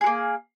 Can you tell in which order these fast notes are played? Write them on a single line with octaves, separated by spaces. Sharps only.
G#4 F#4 A#3